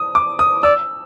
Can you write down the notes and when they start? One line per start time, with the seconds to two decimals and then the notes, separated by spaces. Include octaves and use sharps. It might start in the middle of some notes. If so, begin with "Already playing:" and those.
Already playing: D#6
0.15 D6
0.39 D#6
0.63 D5 E6